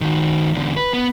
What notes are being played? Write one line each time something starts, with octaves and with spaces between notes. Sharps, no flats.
D#3 F#4
E2 D3
B4
B3